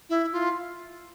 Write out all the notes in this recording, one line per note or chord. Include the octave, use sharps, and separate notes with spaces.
E4
F4